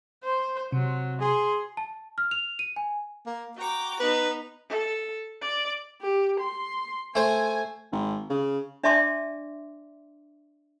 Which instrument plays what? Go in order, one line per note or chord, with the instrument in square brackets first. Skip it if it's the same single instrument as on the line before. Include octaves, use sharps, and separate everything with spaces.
[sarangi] C5
[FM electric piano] C3 [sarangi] F#3
[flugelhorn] G#4 [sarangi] C6
[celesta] A5
F6
F7
D#7
G#5
[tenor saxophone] A#3
[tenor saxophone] F#4 [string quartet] G5 A#5 D6
[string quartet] B3 D#4 [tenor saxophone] B4
[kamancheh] A4
D5
[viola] G4
C6
[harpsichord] A3 C5 [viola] G#5
[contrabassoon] G#1
C#3
[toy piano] D4 D5 E5 A5 C6 D6